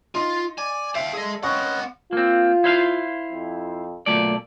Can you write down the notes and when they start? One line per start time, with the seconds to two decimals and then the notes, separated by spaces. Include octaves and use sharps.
0.15 D#4 F4
0.58 D5 G#5
0.95 E5 F5 G5
1.13 G#4 A4 D#5
1.43 C4 C#4 B4 D#5 F#5 C#6
2.13 A#3 C4 F4
2.64 E4 C5 F5
3.32 F2
4.06 B1 A#2 A3 D5